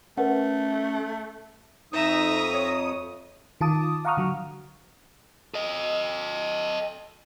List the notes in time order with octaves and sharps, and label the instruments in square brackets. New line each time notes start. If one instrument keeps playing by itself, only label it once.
[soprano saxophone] A3 [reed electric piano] C#4 [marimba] A#4 B4 F#5
[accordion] F2 D#6 [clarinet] D#4 [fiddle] E5 A#5
[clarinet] C#5
[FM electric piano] D#3 F4 A5 D6 D#6
F5 F#5 A#5 C#6 D#6 F6
D3 F#3
[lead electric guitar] A4 D#5